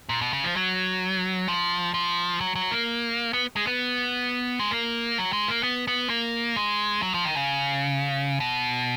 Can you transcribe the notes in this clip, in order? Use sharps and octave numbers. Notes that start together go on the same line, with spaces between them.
A#2
B2
C#3
F3
F#3
F3
F3
F#3
F#3
A#3
B3
G#3
B3
G#3
A#3
F#3
G#3
A#3
B3
B3
A#3
G#3
F#3
F3
D#3
C#3
B2